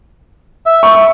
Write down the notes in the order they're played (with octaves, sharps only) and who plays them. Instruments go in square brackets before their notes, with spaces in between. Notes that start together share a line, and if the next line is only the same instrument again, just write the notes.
[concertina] E5
[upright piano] C#6